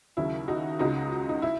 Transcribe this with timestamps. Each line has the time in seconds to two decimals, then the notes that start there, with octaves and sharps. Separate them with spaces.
0.17 D#2 C#3 F#3 E4
0.48 D#4 F#4
0.79 C#2 C#3 G#3 D#4 F#4
1.29 D#4
1.42 E4